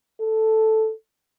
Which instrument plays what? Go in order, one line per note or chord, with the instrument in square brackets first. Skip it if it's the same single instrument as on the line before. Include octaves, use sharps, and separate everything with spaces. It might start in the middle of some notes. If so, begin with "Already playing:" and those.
[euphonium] A4